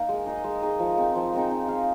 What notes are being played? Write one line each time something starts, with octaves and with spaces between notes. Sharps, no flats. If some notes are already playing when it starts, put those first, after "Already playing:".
Already playing: A#3 C4 D#4 A#4
G#3
D#4 G#4 D#5
G#3
D#4 G#4 D#5
F3
G#3 C4 D#4
F3
G#3 C4 D#4
D#4
G#4 F5